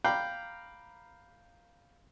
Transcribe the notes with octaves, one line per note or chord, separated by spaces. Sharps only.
F5 G5 A#5 B5 D6